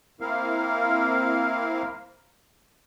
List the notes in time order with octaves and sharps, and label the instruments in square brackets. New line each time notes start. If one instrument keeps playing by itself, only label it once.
[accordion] A#3 C4 E4 A#4 F5